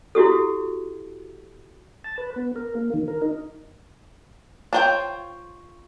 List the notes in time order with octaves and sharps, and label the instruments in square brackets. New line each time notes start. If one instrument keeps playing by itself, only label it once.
[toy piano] E4 F#4 G4 A4
[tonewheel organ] A5
B4
B3
A#4
A#3
D#3
A#4
D#4
[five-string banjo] D4 F4 C5 C#5 G5